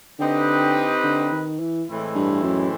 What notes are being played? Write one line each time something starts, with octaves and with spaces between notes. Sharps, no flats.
D3 C4 D#4 G4 B4 D#5
D3
D#3
E3
A2 E3 G#3 C4 E4
G2
F#2